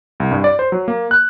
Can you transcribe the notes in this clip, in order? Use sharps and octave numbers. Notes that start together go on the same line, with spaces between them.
C2
G2
D5
C5
F#3
A#3
F#6